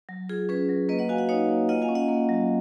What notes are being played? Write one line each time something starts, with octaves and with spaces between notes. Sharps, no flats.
F#3
F4 G#4
C#4 G#4 B4
F#3
A#3 B4 D#5
D#5 F#5
F#4 F5 G#5
D#5 F#5
D#4 C#5 F5
A#3
F4 D#5 F#5
F5 G#5
C#4
D#5 F#5
A#3
F#3